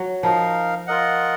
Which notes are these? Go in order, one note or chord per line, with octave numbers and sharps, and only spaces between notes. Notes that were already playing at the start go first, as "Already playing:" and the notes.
Already playing: F#3
F3 D#4 A#4 F5
F4 A#4 D#5 F#5